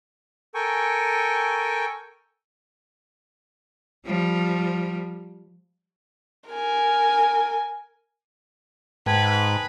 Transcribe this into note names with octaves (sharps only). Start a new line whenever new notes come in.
A4 A#4 G5 G#5 C#6
F3 G3
A#4 G#5
G#2 B4 G5 A5 G#6